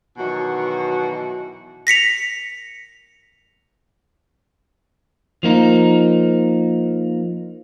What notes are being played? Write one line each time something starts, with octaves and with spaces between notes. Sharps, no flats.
B2 D#3 E3 F#3 F#4
A#6 B6 C#7 F7
F3 A#3 D#4